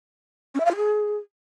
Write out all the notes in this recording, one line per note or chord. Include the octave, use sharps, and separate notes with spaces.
C#4
E5
F5
F4
G#4